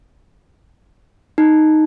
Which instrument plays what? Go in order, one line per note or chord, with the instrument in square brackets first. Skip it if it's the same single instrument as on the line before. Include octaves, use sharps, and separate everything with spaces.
[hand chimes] D#4